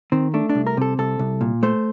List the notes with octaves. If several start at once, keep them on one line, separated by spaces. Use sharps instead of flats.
D#3 C4
A3 D4
D4
C2
A#4
C3 A4
C2 A4
C2
A#2
A3 C5